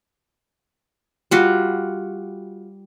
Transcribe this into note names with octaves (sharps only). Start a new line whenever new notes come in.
G3 F4 F#4